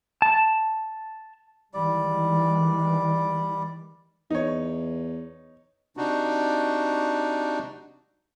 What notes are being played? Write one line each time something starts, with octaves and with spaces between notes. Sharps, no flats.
A5
D#3 E3 G3 G#3 D5
E2 D#4 C#5
C3 D4 D#4 F#4